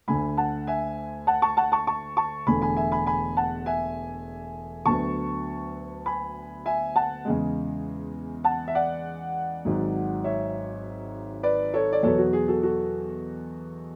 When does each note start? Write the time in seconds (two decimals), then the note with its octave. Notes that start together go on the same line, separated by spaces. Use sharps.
0.08 D2 D3 A3 G#5 B5
0.37 F#5 A5
0.67 E5 G#5
1.27 F#5 A5
1.42 A5 C#6
1.57 F#5 A5
1.72 A5 C#6
1.87 A5 C#6
2.17 A5 C#6
2.47 E1 E2 D3 A3 G#5 B5
2.62 G#5 B5
2.77 E5 G#5
2.92 G#5 B5
3.06 G#5 B5
3.37 F#5 A5
3.66 E5 G#5
4.86 D2 D3 F#3 B3 A5 C#6
6.06 G#5 B5
6.66 E5 G#5
6.96 F#5 A5
7.25 E2 C#3 G#3
8.44 F#5 A5
8.68 E5
8.75 D5 F#5
9.65 G#1 G#2 F#3
10.24 C#5 E5
11.43 B4 D5
11.74 A4 C#5
11.93 D5
12.03 E2 B2 F#3 B3 A4 C#5
12.18 F#4
12.33 G#4
12.48 F#4 A4
12.63 F#4 A4